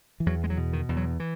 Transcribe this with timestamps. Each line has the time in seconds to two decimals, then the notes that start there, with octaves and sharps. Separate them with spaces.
0.20 E3
0.26 E2 F#3
0.44 G#3
0.50 F#3
0.57 B2
0.73 D#3
0.89 E2
0.97 F#3
1.20 E3